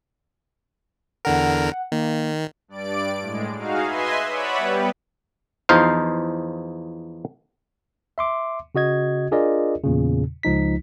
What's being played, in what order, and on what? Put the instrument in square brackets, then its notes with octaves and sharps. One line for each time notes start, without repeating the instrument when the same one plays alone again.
[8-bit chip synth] E2 D3 A#4 [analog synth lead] F#5
[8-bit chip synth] D#3 [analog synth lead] A#3
[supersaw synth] G2 D5 D7
A2 G#3
D#4 F#4 G#4 F5
B4 D#5 E5 G#5 C6
B4 C#5 D5 E5 F#5 B5
G3 B3 G4 B4
[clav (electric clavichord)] E2 F3 D#4 C5 F5
[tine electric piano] E5 C6 D6
C#3 F#4 D#5 G#6
D4 F4 G#4 A#4 D5 D#5
E2 A#2 C#3
C#2 F3 D#4 B6